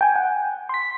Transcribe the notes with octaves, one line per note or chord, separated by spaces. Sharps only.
G5 G#5
F#5
C6 B6